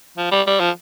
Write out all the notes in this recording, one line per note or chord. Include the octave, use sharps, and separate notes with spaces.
F3
G3
G3
F3